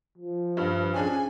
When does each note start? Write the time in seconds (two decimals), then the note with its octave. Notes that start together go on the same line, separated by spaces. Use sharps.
0.18 F3
0.57 G2
0.94 C#4 D4 G#4 G#5